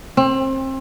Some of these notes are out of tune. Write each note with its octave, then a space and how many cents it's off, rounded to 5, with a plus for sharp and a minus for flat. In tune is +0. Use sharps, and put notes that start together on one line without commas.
C4 +30